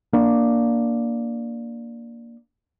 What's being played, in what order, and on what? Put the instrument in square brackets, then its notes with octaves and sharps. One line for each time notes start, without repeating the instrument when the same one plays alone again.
[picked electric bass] A#3 D4